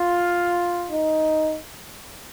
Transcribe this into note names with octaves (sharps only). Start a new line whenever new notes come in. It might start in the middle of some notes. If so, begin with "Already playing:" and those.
Already playing: F4
D#4